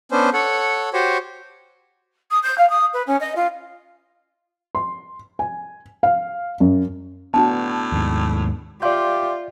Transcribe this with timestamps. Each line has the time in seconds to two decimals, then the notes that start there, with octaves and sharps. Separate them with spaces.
0.12 B3 C#4 D4 C5
0.33 A4 C#5 F#5
0.93 F#4 G4 C5 C#5
2.30 D#6
2.43 G6
2.58 F5
2.69 D#6
2.93 B4
3.07 C#4
3.20 D#5
3.35 F4
4.75 C6
5.39 G#5
6.03 F5
6.60 F#2
7.34 A2 B3 D4 F#4 A5
7.92 D#2 G#2
8.82 F4 G4 D5 E5 F5 C6 G6